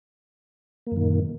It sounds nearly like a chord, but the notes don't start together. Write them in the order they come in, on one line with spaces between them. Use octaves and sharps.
A#3 F#2 D#3 A#2